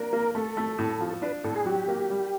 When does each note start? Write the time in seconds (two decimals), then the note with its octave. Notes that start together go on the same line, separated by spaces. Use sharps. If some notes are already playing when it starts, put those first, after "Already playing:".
Already playing: A#3 D4 A#4
0.13 A#3
0.35 A3 A4
0.57 A3
0.78 A2
1.01 F3
1.22 D4 B4
1.44 A2 A4
1.56 G#4
1.66 F#3 G4
1.88 A#3
2.10 G3